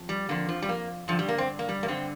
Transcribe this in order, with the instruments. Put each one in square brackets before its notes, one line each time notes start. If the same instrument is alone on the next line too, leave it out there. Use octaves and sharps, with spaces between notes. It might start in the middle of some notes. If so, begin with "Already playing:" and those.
Already playing: [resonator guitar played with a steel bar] F2
G3
F2 D3 A#3
F3
G3
A#3
G2 D3 F3
G3
A#3
C4
A#3
G3
A#3
G2 D3 C4